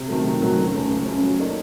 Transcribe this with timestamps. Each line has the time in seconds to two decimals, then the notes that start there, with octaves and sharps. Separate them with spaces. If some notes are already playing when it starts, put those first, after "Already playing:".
Already playing: C3
0.08 D#3 F#3 A3
0.24 C3
0.41 D#3 F#3 A3
0.58 C#2
0.74 C#3 A3 C#4
0.89 C#2
1.06 C#3 A3 C#4
1.22 F#3
1.38 A#3 D#4 A4 C#5